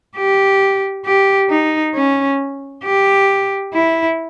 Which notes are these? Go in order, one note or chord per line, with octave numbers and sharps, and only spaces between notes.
G4
G4
D#4
C#4
G4
E4